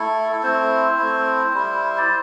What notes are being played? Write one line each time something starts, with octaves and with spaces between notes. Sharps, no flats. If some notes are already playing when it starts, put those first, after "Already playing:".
Already playing: A3 E4 A4
A4
A3 C4 E4 C5
A3 C4 E4
G3 E4
D5